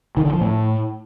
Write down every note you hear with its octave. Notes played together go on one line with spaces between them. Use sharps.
D#3
D3
F3
A2